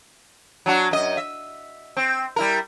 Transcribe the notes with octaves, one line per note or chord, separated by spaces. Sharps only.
F#3 D4 F#4
F#2 D#5
E5
C4
G3 E4 A#4